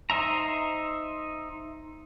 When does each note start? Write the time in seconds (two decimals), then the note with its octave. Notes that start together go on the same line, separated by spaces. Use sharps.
0.10 D#4 C5 D#5 E5 A#5